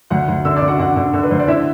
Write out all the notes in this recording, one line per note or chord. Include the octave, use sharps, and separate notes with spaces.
D2 F#5 F#6
D2
D3 E5 E6
D5 D6
D3
F#4 F#5
D3 F#4 F#5
D3
D3
B4
D2 C5
D5
D3 E4 E5